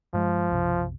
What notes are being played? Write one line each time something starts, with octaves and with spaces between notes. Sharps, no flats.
G2 F3 G#3
B1 F#2 C3